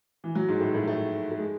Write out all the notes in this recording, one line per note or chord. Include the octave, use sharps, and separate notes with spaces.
E3
F#3
G#2 G#3
A2 A3
A2 A3
A2 A3
A3
G#3